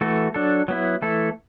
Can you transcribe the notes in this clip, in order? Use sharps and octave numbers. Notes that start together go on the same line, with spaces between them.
E3 A3 F#4 A4
F#3 D4 A4
F#3 B3 E4
E3 A3 E4 A4